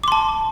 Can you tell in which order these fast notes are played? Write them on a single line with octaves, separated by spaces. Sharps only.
D6 C6 A5